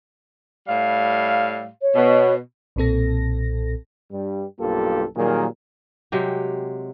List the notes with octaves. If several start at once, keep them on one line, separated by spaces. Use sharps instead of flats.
A2 G3 F5
C#5
B2
B1 A#2 C4 A4 A#6
G2 G3
B1 G2 A#3 F4 G4 A4
A#2 D#3 F#3 G3 G#4 A#4
C3 F#3 G#3 G4